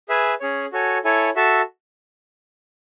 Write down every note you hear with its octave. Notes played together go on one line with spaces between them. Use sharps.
G#4 B4 E5 G#5
C#4 G#4 C#5
F#4 A4 C#5 G#5
E4 A4 C#5 G#5
F#4 A4 E5 A5